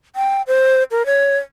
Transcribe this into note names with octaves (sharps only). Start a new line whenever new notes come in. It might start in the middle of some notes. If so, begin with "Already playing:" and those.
G5
C5
A#4
C#5